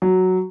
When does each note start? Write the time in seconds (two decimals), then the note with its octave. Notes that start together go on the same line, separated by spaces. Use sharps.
0.02 F#3